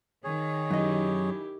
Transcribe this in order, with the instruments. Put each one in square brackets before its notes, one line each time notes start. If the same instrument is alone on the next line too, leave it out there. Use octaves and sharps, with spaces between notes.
[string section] D#3 [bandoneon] G#4 C#5
[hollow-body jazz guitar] F#2 D#5 [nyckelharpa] E4 G4